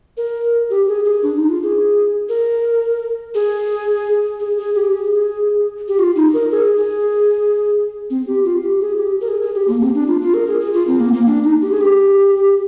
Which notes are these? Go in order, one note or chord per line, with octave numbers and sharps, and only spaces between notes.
A#4
G4
G#4
G#4
D4
D#4
F4
G#4
A#4
G#4
G#4
G#4
G4
G#4
G4
F4
D#4
A#4
G#4
G#4
C4
G4
F4
G4
G#4
G4
A#4
G#4
G#4
G4
A#3
C4
D4
F4
F4
A#4
G#4
G#4
F4
C4
A#3
A#3
D4
D#4
G4
G#4
G4